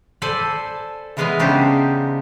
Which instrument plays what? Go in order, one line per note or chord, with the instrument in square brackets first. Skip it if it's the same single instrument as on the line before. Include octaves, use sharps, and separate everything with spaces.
[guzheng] A4 C5 D5 G#5 B5
E2 E3 G#3 B3 F5 G#5
C#3 B3 D4 D#4 G4 C5